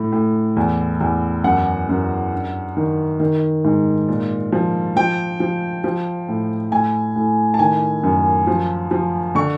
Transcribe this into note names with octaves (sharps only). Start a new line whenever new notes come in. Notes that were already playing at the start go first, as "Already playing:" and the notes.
Already playing: A2
A2
E2
E2
F#2 F#5
F#2
G2
D#3
D#3
G#2
A#2
F3
F3 G5
F3
F3
A2
A2 G#5
A2
A5
D#3 G#5
F#2
F3
F3
D3 C#6